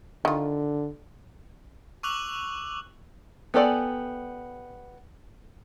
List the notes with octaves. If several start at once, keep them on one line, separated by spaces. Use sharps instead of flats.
D3 D#3 F4
C#6 D6 E6 F#6 F7 F#7
B3 G4 A4 D5 G#5